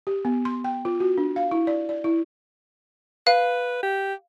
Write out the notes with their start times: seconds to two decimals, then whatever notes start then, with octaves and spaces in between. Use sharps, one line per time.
0.07 G4
0.25 B3
0.45 C6
0.64 G5
0.85 F4
1.00 F#4
1.18 D4
1.36 F5
1.51 E4
1.67 D5
1.89 D5
2.04 E4
3.27 B4 F5
3.83 G4